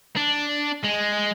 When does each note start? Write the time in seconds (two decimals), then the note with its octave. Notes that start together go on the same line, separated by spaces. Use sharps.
0.16 D4
0.84 G#3